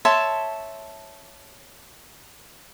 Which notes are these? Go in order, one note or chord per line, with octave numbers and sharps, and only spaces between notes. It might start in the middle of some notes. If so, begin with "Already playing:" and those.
C#5 E5 A5 C6